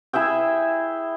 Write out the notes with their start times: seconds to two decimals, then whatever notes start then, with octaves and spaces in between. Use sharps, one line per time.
0.13 E4 G#4 E5 G5